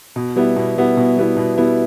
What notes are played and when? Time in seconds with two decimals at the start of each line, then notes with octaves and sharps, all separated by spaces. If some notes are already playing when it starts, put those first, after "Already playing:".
0.16 B2
0.36 G3 B3 E4
0.56 B2
0.77 G3 B3 E4
0.97 B2
1.17 G3 B3 E4
1.37 B2
1.58 G3 B3 E4